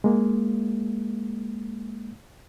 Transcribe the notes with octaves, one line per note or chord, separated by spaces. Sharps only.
G#3 A#3